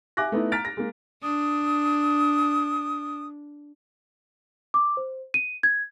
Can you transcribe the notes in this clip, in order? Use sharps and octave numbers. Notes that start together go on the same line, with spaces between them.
E5 G#5 D6 F#6 A#6
A3 B3 D#4 E4
A#5 F6 A6 B6 D7 F7
A#6
G#3 A#3
D4 D#6
D6
C5
D#7
G#6